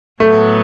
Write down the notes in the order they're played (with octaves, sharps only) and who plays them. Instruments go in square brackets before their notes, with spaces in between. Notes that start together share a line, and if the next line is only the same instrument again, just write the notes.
[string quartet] A2 F#3 B3 [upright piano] A3